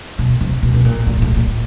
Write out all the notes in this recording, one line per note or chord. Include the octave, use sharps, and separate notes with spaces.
B2
C3
B2
B2
A#2
A#2
A2
A#2